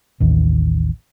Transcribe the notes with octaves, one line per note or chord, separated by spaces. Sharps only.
A1 D#2